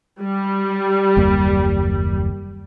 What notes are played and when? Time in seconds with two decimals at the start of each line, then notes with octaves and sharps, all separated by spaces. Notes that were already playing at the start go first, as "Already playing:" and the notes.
0.21 G3
1.17 F#1 D#2 A#3